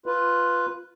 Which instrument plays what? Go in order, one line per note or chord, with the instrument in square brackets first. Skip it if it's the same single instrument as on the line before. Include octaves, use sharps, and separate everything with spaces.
[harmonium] F4 B4